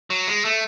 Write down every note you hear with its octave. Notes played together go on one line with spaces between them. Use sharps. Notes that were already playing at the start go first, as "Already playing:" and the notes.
F#3
G#3
A3